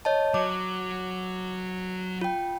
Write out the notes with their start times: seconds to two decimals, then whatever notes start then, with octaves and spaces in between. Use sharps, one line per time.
0.05 C#5 D#5 A5
0.34 F#3 D6
2.21 F4 G5